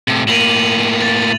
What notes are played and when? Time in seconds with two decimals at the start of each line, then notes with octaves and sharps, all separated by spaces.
0.08 A2 C3
0.28 A2 A#3 D#7 F7 F#7
1.02 A6